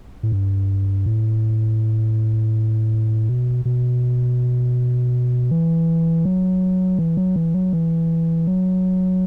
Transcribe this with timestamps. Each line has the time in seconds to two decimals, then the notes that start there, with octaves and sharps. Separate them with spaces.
0.23 A2
0.32 G2
1.06 A2
3.29 B2
3.65 B2
5.51 E3
6.25 F#3
6.99 E3
7.17 F#3
7.36 E3
7.54 F#3
7.73 E3
8.47 F#3